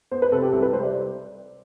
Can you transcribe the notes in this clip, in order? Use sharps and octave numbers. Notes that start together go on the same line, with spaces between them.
B3 C5
B4
C3 A4
G4
C2 A4
B4
G3 C5
D5